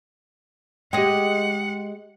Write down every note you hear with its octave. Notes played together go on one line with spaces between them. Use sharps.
G#3 G4 D#5 F#5 G5